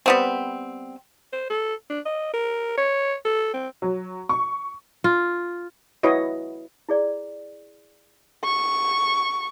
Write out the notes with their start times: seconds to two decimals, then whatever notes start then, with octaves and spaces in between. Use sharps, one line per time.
0.06 G3 B3 C4
1.33 C5
1.50 A4
1.90 D4
2.05 D#5
2.33 A#4
2.77 C#5
3.25 A4
3.54 C4
3.82 F#3
4.29 C#6
5.04 F4
6.03 E4 F#4 B4 C#5 D#5
6.89 E4 G#4 D5
8.44 C#6